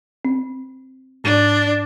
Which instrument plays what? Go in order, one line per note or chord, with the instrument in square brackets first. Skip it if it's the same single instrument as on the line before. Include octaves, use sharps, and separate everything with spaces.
[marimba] C4
[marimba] G#2 [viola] D4